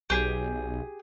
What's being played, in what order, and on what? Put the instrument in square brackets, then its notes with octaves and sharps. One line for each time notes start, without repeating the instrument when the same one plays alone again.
[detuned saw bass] B1 [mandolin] G4 G#4